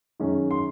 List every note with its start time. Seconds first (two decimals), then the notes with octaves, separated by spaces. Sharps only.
0.20 F#2 D#3 G#3 C#4
0.51 C6